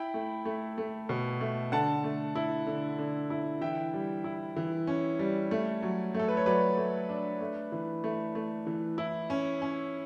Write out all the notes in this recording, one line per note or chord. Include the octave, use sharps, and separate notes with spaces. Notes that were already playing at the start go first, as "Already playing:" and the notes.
Already playing: E4 G5 B5
A3
A3
A3
B2
A3
D3 F#5 A5
A3
E4
D3
D3
E4
E3 E5 G5
G3
E4
E3
C#4
G3
A3
F#3
A3 A4
B4
C#5
F#3 B4 D5
A3
D4
A3
E3
A3
A3
E3
E4
C#4
C#4